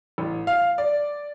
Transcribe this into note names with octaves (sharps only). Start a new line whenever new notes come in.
A1
F5
D5